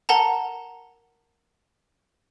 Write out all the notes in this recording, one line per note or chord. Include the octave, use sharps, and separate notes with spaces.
A#4 F#5 A5 A#5